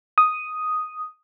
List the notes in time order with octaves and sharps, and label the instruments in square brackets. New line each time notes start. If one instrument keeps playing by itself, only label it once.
[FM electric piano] D#6